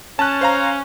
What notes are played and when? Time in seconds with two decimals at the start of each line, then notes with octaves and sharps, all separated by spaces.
0.19 C#4 A5 F#6
0.41 C5 F5 A#5